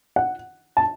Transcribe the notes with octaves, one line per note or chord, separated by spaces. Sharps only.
F#5
A5